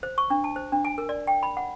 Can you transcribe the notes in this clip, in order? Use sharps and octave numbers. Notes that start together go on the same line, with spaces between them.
C5
C#6
D4
A5
C5
D4
G#5
A#4
D5
G5
B5
F#5